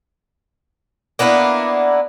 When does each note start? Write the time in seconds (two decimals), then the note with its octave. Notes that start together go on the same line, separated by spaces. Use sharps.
1.19 A#3 B3 D4 E4